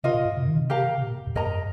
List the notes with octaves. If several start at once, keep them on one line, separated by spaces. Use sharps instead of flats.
C3 F4 A#4 D#5
A#2
G2
C3
D#3
C3
G4 A#4 F5 A#5
C3
A#2
F2
G2 A#4 D#5 A#5
G2